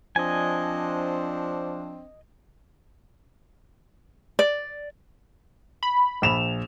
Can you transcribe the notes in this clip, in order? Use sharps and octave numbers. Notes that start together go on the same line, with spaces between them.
F3 C4 D4 D#5 G#5
D5
B5
A#1 E7 F7